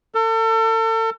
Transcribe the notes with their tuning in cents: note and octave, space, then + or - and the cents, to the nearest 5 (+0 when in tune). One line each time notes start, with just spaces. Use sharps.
A4 +35